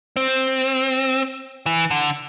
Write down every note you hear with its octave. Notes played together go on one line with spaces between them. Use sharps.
C4
E3
D3